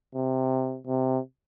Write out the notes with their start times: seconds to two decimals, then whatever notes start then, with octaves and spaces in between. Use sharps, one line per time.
0.15 C3
0.87 C3